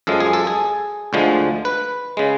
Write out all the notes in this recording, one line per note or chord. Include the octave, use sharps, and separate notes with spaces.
F#2 F3 G#3 A4
G#4
A4
G#4
D2 D3 F3 G#3
B4
C#3 G#3